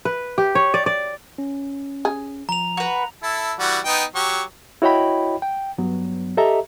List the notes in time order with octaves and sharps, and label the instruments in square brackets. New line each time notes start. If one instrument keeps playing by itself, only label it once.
[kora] B4
G4
C#5
D5
D5
[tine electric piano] C#4
[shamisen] G#4
[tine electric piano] F3 [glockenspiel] A#5 F7
[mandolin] F#4 B4
[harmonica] E4 A4
E3 G3 F#4
B3 D#4 G5
F#3 G4 C#6
[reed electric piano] E4 F#4 C#5 D#5 G5 B5
G5
G2 F#3 B3
G4 A4 D#5 E5 A#5